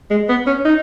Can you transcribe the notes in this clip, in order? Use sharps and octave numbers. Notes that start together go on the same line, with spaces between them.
G#3
B3
C#4
D#4